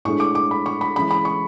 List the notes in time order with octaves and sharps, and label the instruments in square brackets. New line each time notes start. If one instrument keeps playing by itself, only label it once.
[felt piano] A2 G#3 D4 C#6
D6
D6
B5
C#6
B5
E3 G#3 C#4 B5
B5
C#6